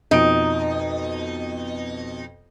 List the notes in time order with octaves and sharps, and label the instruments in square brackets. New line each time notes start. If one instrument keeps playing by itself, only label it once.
[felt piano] F2 B2 D7 [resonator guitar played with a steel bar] D#4